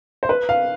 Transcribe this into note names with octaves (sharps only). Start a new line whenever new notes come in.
C5
B4
F5